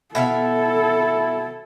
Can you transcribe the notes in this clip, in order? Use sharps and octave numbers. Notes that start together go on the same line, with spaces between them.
B2 E4 A4 E5 F5